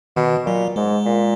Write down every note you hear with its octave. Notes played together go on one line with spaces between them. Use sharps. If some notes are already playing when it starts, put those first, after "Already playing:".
B2 D#3
A#2 F#3
G#2 G#3
A#2